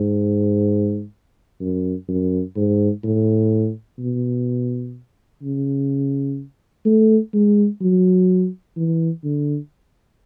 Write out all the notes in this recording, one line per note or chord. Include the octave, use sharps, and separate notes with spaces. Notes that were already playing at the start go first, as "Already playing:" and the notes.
Already playing: G#2
F#2
F#2
G#2
A2
B2
C#3
A3
G#3
F#3
E3
D3